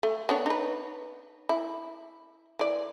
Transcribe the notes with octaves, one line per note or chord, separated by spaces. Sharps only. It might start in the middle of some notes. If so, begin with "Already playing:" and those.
A3
B3 D4 C#5
D#4 B4
E4
E3 D5